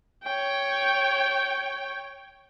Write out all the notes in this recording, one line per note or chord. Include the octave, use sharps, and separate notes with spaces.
C#5 G5